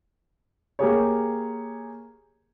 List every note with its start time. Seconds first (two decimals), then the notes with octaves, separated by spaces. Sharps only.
0.79 A#3 G4 G#4 C#5